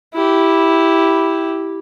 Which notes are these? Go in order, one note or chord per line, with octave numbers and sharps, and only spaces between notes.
E4 G4